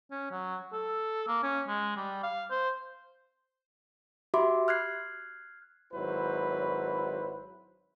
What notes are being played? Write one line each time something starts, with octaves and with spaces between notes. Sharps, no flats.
C#4
F#3
A4
A#3
C#4
G#3
G3
F5
C5
F#4 G4 E5 B5 C6 D6
F6 F#6 G#6 C7
G#1 F#3 E4 B4 C5